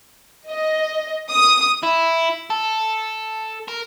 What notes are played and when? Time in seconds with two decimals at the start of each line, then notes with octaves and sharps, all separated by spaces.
0.48 D#5
1.31 D#6
1.83 E4
2.50 A4
3.68 A#4